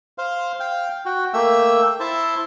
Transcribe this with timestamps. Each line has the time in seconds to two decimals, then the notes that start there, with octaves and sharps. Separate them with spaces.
0.18 C5 F5
0.60 F5 G5
1.06 F#4 G5
1.34 A3 A#3 E5 G5 E6
2.00 E4 C5 E5 A5